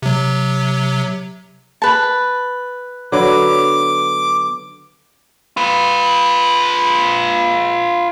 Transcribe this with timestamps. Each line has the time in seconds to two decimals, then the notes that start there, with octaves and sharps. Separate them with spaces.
0.02 C3 F#3
1.82 B4 A5
3.12 D3 F#3 B3 D6
5.57 F4 B4